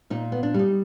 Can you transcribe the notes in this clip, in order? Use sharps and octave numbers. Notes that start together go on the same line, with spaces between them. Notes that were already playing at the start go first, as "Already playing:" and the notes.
A#2 D#4
B3
D4
G3 D#4